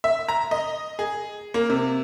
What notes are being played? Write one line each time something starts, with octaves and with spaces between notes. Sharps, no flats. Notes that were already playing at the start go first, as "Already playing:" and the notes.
E5
A#5
D#5
G#4
A#3
C3